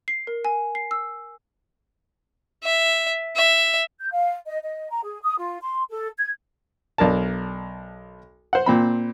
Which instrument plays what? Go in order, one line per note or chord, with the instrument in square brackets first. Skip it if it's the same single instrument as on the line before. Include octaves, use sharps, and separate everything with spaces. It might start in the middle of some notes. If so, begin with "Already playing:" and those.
[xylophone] C7
A#4
G#5
C7
E6
[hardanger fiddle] E5
E5
[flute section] G6
F5
D#5
D#5
A#5
G#4
D#6
F4
C6
A4
G#6
[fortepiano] B1 D4 A#4 A5
C5 F#5
A#2 C4 B5